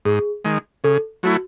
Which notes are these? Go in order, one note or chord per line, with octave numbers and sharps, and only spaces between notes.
G#2 G#4
D#3 G#3
C#3 A4
F#3 A3 E4 F#4